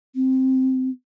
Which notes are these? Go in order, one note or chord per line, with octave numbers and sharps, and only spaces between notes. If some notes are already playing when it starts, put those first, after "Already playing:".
C4